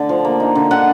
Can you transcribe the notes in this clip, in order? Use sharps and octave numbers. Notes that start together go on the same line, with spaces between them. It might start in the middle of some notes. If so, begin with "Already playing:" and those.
Already playing: D3 A3 D5
F3
A#3
D#4
D3
D3 F#5